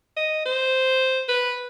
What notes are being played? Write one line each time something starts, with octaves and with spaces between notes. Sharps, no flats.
D#5
C5
B4